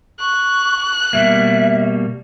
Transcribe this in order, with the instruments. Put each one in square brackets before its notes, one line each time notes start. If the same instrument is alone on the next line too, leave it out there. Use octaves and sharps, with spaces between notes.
[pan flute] C#6 [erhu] F#6
[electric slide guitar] B2 G3 A#3 [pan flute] E5